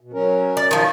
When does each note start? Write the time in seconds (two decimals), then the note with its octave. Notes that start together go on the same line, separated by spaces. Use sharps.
0.01 B2
0.13 F#3 C#4 A#4
0.57 D5
0.71 B2 D#3 F3 D#4